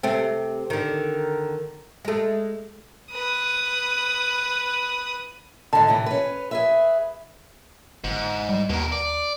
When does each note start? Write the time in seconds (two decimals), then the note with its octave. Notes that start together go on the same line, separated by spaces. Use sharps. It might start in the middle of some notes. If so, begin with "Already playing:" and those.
0.03 C3 A3 C4
0.70 D3 D#3
2.05 G#3 A3
3.13 B4 D#6
5.73 G#2 D3 A5
5.87 A2 C3 E3
6.06 C#4 B4
6.51 G#4 B4 E5
8.04 G1 G#2
8.49 G3
8.69 D#2 B2 A#4
8.92 D5